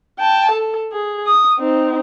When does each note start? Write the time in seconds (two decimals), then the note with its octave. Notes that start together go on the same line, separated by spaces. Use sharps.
0.19 G5 A5
0.51 A4
0.92 G#4
1.27 D#6
1.59 C4 D#4